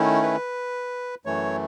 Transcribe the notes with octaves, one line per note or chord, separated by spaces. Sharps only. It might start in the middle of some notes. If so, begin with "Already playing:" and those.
Already playing: D#3 A3 C#4 E4
B4
F#2 E3 A3 C#5